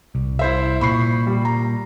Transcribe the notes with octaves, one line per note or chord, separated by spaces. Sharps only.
C2
E4 C5 E5
A#2 B5 C#6 C7
G3
A#5